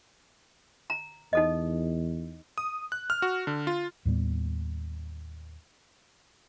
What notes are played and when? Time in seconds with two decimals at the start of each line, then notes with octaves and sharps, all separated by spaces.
0.90 A#5
1.33 E2 D#4 A4 D#5
2.58 D#6
2.92 F#6
3.10 F6
3.22 F#4
3.47 D3
3.67 F4
4.05 D#2 A2 G3 B3